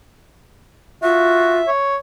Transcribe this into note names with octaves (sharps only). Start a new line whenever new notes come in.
F4 F#4 E5
C#5